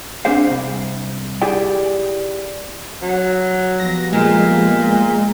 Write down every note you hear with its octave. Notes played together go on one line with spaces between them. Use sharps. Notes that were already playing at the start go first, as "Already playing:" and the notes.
C4 D4 G#4 C5 F5
C2
E4 G4 G#4 D5 G5
F#3
F3 G3 B3 A#6
A#2 G#3